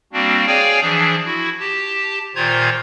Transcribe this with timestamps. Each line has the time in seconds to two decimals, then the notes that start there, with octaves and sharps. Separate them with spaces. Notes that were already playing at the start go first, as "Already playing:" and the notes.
0.13 G3 A#3 C4 D4 F#4
0.47 G#4 C#5 D5 F5 G5 G#5
0.81 E3 F3 D4 G#4
1.25 E4 F#4
1.60 G4 A5
2.35 A#2 D#3 F4 C5 A#5 G#6